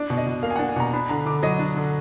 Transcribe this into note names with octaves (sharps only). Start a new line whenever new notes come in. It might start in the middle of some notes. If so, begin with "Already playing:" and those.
Already playing: D4 D5
B2
D#5
B2
A#3 F5
G#5
D4 F#5
G#5
B2 A#5
D4 B5
D3 A#5
D3 D6
F#3 D#5
D4
D3